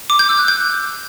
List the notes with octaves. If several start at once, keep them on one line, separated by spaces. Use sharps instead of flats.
D6
G6
E6
F#6
G6